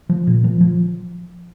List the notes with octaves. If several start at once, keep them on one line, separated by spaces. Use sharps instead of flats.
F3
A#2
F3
F3